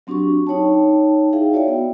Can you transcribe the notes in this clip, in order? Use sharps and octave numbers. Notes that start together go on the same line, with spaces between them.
F#3 C4 D4 F#4 G4 C#6
D#4 C#5 G5 A5
D#4 E4 G#4 E5 F5 G5
F#4 C#5 D5 E5 G5
B3 E4